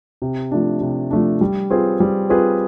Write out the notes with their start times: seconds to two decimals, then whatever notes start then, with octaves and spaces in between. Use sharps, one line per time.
0.22 C3
0.51 F3 A3 D4
0.81 C3
1.11 F3 A3 D4
1.41 G3
1.70 C4 F4 G#4 B4
2.00 G3
2.29 C4 F4 G#4 B4